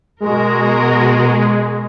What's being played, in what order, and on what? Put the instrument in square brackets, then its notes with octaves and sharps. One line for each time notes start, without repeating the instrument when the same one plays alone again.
[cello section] B2 F#4 A#4 [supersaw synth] G#3